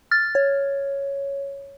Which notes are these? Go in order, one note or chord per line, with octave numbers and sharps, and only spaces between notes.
F6 A6
C#5